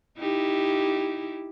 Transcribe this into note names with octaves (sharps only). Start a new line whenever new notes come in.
D#4 E4 G4